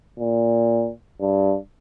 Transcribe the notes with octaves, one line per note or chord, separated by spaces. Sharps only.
A#2
G2